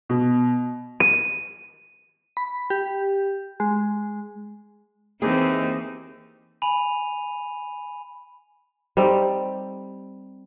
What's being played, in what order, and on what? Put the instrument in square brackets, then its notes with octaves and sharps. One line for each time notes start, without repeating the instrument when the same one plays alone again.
[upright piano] B2
[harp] D#7
[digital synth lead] B5
G4
G#3
[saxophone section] D#2 D#4 [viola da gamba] E3 C4 [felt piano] A#3 [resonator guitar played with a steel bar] G#4
[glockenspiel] G#5 B5 D#7 F7
[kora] G3 C4 D#4 A4